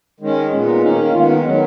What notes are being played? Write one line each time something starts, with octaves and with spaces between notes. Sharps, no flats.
D#3 G#3 C#4
A#2 G#3 B3 C#4
D#4
D#3 A#3 C#4 D#4
D#3 G#3 B3 F4
D#4
D#3 F#3 B3 C#4